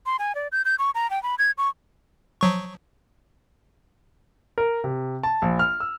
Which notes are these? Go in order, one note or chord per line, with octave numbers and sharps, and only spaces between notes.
C6
G#5
D5
G6
G6
C#6
A#5
G5
B5
G#6
C#6
F3 F#3 C#6
A#4
C3
A5
A#1
F6
E6